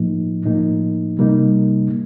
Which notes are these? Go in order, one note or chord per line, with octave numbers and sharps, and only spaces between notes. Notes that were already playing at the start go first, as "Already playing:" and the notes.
Already playing: A2 F3 A#3 D#4
A2 F3 A#3 D#4
C3 G3 A#3 D#4